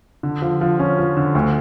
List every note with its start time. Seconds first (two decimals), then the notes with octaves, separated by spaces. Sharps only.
0.23 D3
0.42 F3
0.61 F3
0.79 C#4
0.98 F3
1.17 D3
1.35 D2